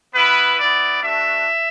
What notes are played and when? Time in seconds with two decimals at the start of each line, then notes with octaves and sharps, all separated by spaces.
0.14 B3 E4 B4
0.58 B3 E4 D5
1.03 A3 D4 F#4 E5